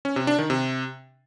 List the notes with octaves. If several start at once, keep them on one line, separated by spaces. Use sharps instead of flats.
C#4
C3
D4
D#3
C3